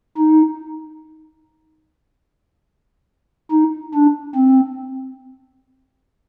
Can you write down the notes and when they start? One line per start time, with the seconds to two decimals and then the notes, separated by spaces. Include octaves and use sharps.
0.17 D#4
3.51 D#4
3.94 D4
4.36 C4